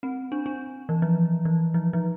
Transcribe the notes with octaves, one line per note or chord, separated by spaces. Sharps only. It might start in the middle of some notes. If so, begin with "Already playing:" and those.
C4
D4
D4
E3
F3
E3
F3
F3